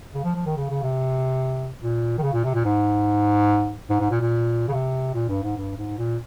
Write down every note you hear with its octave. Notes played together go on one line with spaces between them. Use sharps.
C#3
F3
F3
D#3
C#3
C#3
C3
A#2
D#3
C#3
A#2
C3
A#2
G#2
G#2
G#2
A#2
A#2
C#3
C3
A#2
G2
G#2
G2
G#2
A#2